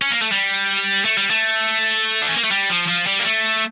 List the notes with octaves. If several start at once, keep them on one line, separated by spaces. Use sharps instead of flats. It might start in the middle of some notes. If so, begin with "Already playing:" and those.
C#4
A#3
A3
G3
A3
G3
A3
D4
C#4
A#3
A3
G3
F3
F3
G3
A#3
A3